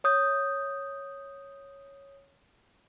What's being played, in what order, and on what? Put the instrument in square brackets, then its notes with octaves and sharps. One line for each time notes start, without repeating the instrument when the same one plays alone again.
[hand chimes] C#5 D#6 G6